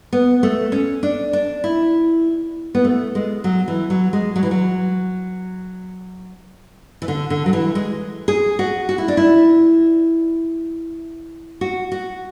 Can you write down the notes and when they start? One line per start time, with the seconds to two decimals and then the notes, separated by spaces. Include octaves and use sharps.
0.13 B3
0.43 A3
0.72 C#4
1.03 D4
1.33 D4
1.64 E4
2.75 B3
2.85 A3
3.15 G#3
3.44 F#3
3.68 E3
3.90 F#3
4.13 G#3
4.36 F#3
4.43 E3
4.51 F#3
7.02 E3
7.08 D3
7.30 D3
7.46 F#3
7.53 E3
7.75 G#3
8.28 G#4
8.59 F#4
8.89 F#4
8.98 E4
9.08 D4
9.17 E4
11.61 F#4
11.92 F#4